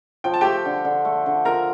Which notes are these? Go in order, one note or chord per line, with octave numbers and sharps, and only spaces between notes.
F3 G5
A5
A3 G4 G5
D3
D3
A3
D3
F4 A#4 A#5